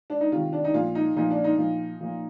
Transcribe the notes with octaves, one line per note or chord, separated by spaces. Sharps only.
D4
D#4
C3 D#3 F4
D4
D#4
A#2 F3 F4
D#4
A#2 F3 D#4
D4
D#4
A#2 F3
A#2 F3